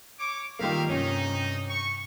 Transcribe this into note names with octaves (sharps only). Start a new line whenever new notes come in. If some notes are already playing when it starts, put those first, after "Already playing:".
C#5 D6
D#3 G3 A#3 F4 A#4 E5 F5
G2 C3 C#4 D#4
C#6